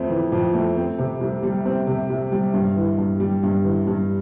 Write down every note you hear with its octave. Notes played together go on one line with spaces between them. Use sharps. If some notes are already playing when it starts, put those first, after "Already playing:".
Already playing: F2 A3 C4
E3
F2
A3
C4
C3
C2
G3
C4
C3
C2
G3
G2
E3
G2
G3
G2
E3
G2